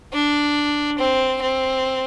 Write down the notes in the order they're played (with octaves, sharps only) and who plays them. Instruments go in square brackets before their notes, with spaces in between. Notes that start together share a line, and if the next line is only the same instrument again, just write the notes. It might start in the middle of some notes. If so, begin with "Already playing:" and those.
[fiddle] D4
C4
C4